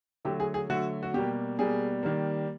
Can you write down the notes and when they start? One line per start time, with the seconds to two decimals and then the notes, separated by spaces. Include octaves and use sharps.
0.25 D3 F#3 A3 G4
0.40 G#4
0.54 G#4
0.70 D3 F#3 A3 F#4
1.03 F#4
1.14 B2 G3 A#3 G4
1.59 B2 G3 A#3 G#4
2.03 D#3 G3 A#3